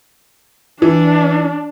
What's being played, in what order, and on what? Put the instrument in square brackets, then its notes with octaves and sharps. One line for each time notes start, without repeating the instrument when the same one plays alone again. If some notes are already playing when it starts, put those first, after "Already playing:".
[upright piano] E3 [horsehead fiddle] D4